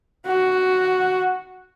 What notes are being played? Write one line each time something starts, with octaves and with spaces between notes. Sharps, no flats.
F#4